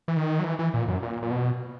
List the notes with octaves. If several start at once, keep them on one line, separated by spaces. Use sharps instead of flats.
E3
D#3
F#3
E3
E3
A#2
F#2
A#2
A#2
B2